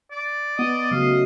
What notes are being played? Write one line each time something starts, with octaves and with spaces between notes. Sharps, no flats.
D5
B3 D#5
C#3 F#3 A3 F5